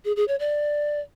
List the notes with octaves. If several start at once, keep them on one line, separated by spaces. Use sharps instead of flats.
G#4
G#4
C#5
D5